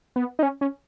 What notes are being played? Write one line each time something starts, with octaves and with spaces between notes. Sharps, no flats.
B3
D#4
C#4
C#4